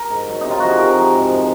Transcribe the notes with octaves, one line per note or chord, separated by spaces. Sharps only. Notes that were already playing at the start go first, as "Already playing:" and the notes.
Already playing: A#4
G#2
F#3
C3 D#4
F4
F3 F#4
G#4
C3 A#4
F3
G#2
F3